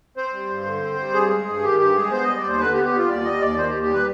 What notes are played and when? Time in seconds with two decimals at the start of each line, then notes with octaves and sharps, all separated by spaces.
0.17 C4 C5
0.33 G3
0.49 G2
0.66 D3
0.82 C4
0.99 G3
1.14 G2 G#4
1.30 G#3
1.47 G2
1.63 D#3 G4
1.79 G2 G4
1.95 G#3 G#4
2.11 B3 C5
2.23 G3 D#5
2.36 D5
2.43 D#2
2.48 C5
2.59 D3 B4
2.73 G4
2.76 B3
2.84 G4
2.92 G3 F4
3.08 D#2 D5
3.24 G3 D#5
3.41 D#2 D5
3.58 D#3 C5
3.69 G4
3.73 D#2
3.82 G4
3.89 G3 B4